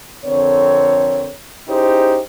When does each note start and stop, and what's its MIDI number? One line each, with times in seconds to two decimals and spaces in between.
0.24 1.30 41
0.24 1.30 50
0.24 1.30 60
0.24 1.30 70
0.24 1.30 73
1.68 2.19 61
1.68 2.19 63
1.68 2.19 64
1.68 2.19 67
1.68 2.19 68
1.68 2.19 72